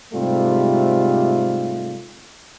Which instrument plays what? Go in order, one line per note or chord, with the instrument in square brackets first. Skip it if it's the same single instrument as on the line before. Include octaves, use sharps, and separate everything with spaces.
[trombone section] G#2 C3 G3 A3 F4